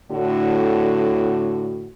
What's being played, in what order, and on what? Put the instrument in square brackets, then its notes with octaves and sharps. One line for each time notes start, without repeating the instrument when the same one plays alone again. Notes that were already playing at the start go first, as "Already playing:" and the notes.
[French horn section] A2 D3 F#4